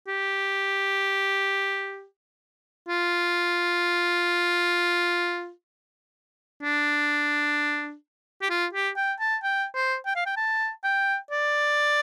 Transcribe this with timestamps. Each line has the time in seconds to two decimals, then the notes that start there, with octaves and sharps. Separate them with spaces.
0.08 G4
2.88 F4
6.63 D4
8.42 G4
8.50 F4
8.73 G4
8.96 G5
9.20 A5
9.43 G5
9.75 C5
10.06 G5
10.16 F5
10.26 G5
10.37 A5
10.84 G5
11.31 D5